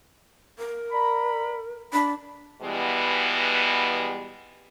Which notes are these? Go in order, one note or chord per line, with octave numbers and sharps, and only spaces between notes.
A#4
D5 A#5 B5
D4 B5
B2 E3 G3 G#3 B3